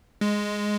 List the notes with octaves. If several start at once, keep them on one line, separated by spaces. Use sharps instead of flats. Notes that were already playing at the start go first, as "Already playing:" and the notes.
G#3